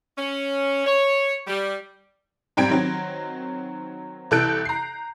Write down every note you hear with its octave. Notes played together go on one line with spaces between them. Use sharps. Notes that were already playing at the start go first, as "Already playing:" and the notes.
C#4
C#5
G3
G#2 G3 C4 G5 G#6 D7
D#3 F#3 C4
C2 E3 A4 F#6 G6 D7
A#5 C7